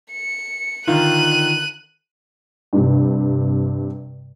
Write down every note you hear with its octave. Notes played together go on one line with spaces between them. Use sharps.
C#7
D3 D#3 F4 F#6 D#7
G2 C3